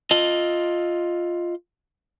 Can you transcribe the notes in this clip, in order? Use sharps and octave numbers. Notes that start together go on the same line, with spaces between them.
F4 D#5